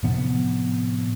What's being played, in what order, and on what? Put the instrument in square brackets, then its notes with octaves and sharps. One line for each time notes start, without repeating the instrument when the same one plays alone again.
[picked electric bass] A2 C3 F3 B3